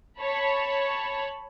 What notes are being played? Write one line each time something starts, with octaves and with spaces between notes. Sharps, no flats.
C#5 A5 B5